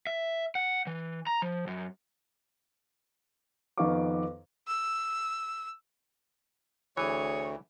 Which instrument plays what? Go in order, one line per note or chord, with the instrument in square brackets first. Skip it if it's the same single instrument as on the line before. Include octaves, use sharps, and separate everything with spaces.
[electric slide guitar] E5
F#5
E3
A#5
F3
F#2
[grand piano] F2 D#3 B3 F5 C#6 D6
[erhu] E6
[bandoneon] D2 [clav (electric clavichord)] E3 [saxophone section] G#4 C#5